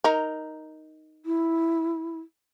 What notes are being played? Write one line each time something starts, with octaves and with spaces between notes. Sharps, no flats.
D#4 A#4
E4